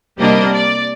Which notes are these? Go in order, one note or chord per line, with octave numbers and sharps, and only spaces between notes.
C3 G3 A#3 D4 D#5
D5